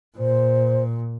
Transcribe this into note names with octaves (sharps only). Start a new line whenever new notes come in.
A#2 C5